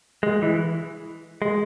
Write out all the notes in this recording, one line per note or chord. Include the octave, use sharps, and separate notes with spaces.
G#3
E3
G#3